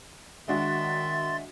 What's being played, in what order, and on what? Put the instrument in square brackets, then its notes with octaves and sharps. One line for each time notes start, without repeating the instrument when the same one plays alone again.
[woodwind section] D#3 E5 [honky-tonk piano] G#3 D4 F#4 [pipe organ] C6 A6